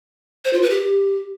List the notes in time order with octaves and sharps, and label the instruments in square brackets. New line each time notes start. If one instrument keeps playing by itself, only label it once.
[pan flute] C5
F4
B4
G4